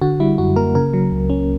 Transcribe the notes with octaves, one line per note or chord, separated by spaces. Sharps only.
D3 F#4
G3 E4
F#2 F#4
A#3 A#4
C#3 A#4
F#3
C#2
C#4